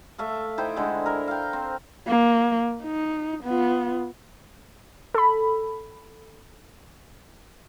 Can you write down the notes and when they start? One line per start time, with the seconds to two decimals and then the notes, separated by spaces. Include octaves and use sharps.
0.18 A3 E5 F5
0.58 D#4 E4 C5 G5
0.76 D3 G#3
1.06 E4 A#4
1.28 F5 G5
1.53 C4
2.07 A#3
2.83 D#4
3.44 B3 F4
5.15 A4 B5